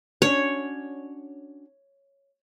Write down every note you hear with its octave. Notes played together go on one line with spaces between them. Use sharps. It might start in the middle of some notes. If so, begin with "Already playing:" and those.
C#4 D4 F#4 C#5